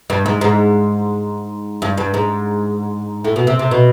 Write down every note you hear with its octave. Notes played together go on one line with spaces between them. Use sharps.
G2
G#2
G#2
G2
G2
G#2
A2
B2
C3
C3
B2